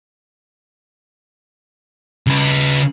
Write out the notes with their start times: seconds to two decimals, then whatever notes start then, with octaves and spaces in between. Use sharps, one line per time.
2.27 C#3 B4